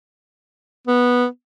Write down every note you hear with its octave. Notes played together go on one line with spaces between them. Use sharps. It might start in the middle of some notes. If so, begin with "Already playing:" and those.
B3